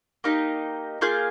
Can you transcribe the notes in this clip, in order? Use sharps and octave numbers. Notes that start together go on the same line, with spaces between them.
A#3 D#4 G4
A#3 F4 G#4 G6